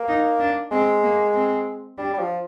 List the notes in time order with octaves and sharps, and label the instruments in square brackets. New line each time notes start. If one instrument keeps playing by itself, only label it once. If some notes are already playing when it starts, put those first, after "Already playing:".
Already playing: [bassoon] A#3
[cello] D#4
D4
[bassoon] G#3 [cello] C4
[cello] A#3
C4
[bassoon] G3 [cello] D4
[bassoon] G3
F3